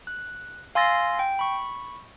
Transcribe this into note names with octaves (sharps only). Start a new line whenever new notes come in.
F#6
F5 G#5 C6 E6 A6 A#6
G5
B5 C#6